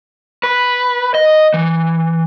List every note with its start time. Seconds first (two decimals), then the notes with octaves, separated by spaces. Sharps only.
0.43 B4
1.14 D#5
1.54 E3